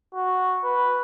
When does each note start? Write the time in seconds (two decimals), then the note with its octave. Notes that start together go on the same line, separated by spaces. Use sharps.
0.15 F#4
0.64 B4